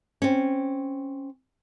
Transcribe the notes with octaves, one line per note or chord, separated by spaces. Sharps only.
C4 C#4